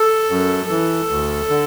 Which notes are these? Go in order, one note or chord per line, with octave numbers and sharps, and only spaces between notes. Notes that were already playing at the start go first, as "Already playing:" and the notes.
Already playing: A4
F#2
E3
D2
D3